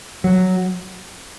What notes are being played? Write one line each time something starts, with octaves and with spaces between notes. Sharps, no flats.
F#3